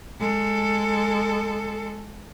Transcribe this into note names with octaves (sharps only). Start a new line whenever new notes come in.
G#3 A4